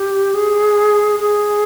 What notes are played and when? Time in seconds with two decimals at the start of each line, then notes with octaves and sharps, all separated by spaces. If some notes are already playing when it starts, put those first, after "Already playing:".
Already playing: G4
0.34 G#4
1.19 G#4